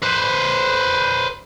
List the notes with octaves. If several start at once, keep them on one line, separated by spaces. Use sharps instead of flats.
B4 C5